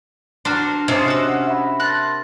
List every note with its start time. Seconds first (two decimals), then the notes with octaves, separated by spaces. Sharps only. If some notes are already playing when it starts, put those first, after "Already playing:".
0.45 D4 F#4 A#4 C5
0.88 C3 C#4 F4 C5 D5 D#5 D#6
1.08 F#4 E6
1.28 F#5
1.47 E5 B5
1.80 A#4 A5 C6 F#6 A6 A#6